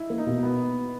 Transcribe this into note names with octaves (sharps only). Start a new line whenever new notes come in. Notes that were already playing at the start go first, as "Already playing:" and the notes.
Already playing: D#4 E4
A#3
D#4
B2
B3